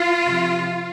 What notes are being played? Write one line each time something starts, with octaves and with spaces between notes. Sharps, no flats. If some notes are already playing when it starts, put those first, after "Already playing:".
Already playing: F4
C3 F3